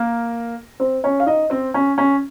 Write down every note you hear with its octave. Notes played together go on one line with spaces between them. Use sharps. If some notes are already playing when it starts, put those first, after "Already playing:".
Already playing: A#3 A#4
C4 C5
C#4 C#5
F5
D#4 D#5
C4 C5
C#4
C#4